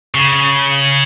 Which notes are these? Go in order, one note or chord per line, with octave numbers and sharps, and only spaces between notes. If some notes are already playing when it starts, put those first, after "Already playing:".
C#3